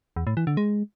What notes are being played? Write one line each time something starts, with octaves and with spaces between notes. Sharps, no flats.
E2
A2
E3
D3
G#3